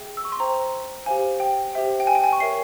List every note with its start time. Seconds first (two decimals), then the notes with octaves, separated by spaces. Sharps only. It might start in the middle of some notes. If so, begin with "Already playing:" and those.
Already playing: G#4 E5 G5
0.17 E6
0.25 C#6
0.32 C6
0.40 C5 G5 A#5
1.06 G4 C5 F5 G#5
1.40 G5
1.73 G4 C5 E5 G5
2.00 G5
2.07 G#5
2.15 G5
2.24 G#5
2.33 C#6
2.40 A#4 C#5 E5 C7